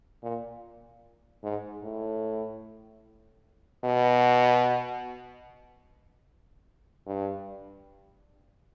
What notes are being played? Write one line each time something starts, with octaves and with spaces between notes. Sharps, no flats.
A#2
G#2
A2
B2
G2